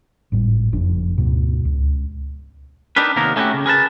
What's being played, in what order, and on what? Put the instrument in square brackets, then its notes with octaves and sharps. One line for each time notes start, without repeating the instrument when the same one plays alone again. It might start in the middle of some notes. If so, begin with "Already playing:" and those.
[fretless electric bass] G#1 A2 G3
F#1 F2 D4
D2 G#2 B2
C#2
[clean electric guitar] D4 D#4 G4 A#4 B4
D#2 C3 A#3 B3 A#4
A3 C#4 D#4 E4 F#4 G4
C#3
G#4 A#4 B4 A5